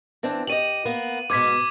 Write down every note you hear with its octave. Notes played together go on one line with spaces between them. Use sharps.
E3 C4 D4
G4 D5 D#5 D#7 F#7
A#3 B3
G#2 B2 D6 G#6 B6